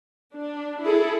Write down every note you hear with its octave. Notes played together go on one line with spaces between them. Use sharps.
D4
E4 G#4 A4